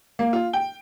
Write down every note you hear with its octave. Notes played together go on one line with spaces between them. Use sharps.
A#3
F4
G5